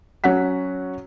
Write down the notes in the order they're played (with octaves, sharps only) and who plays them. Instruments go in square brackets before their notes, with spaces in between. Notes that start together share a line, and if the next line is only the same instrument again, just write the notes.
[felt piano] F#3 C#4 F#4 F#5 B6